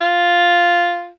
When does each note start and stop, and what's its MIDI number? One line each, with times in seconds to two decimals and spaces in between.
0.01 1.10 65